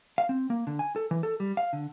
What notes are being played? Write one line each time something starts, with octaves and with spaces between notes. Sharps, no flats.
F5
C4
A#3
D3
G#5
A4
E3
A4
G3
F5
D3